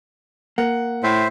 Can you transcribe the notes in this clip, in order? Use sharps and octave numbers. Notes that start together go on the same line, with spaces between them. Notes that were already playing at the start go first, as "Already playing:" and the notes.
A#3 F#5
A2 C5 E5